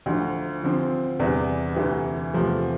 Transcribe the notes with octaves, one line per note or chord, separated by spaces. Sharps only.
D2 D3 F3
D3 F3 C4
E2 C3 E3 G3 D4
D2 C3 E3
E2 C3 F3 A3